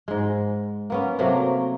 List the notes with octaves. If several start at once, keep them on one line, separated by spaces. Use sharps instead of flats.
G#2 G#3
A#3 B3 C#4
C3 F#3 A3 A#3